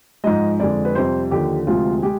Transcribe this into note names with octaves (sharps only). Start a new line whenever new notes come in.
G#2 F3 G#3 D#5
F2 D3 G#3 D5
B4
F2 C3 G3 C5
D#2 D3 F3 G4
D2 C3 F3 G#3 F4
G#3 G4